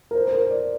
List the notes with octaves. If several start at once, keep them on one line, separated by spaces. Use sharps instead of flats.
A#4
C5
C5
A#4
D5